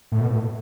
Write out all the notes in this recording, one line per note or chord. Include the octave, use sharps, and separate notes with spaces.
A2
B2
A2